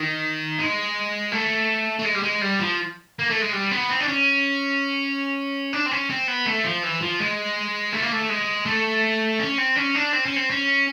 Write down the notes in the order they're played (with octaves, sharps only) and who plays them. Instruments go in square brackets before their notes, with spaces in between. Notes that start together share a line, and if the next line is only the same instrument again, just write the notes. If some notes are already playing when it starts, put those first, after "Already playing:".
Already playing: [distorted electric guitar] D#3
G#3
A3
A3
G#3
G3
G#3
G3
F3
A#3
A3
G#3
G3
B3
C4
D4
C#4
D4
C4
C#4
C4
B3
A3
F3
E3
F3
G#3
A3
A#3
A3
G#3
A3
C#4
C4
C#4
D4
C4
C#4
C4
C#4